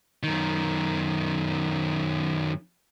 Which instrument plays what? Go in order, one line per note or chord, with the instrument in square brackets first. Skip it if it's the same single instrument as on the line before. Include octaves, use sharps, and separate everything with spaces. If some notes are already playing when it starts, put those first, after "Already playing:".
[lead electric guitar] F#2 D#3